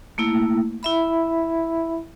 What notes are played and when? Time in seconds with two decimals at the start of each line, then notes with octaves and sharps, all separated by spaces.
0.18 A3 A#3 E4
0.83 E4 E5 B5